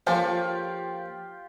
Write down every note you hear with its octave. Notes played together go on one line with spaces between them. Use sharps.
F3 A#3 C#4 F4 G4 A4 C5